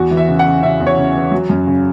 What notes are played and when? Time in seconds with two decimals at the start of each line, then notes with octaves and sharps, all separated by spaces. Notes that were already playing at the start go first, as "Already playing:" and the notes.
Already playing: E2 F#4
0.11 E3
0.17 E5
0.28 C#3
0.39 F#5
0.46 C#3
0.62 C#3 E5
0.80 E2
0.87 C#5
0.97 C#3
1.15 E3
1.32 F#3
1.49 F#2
1.67 C#3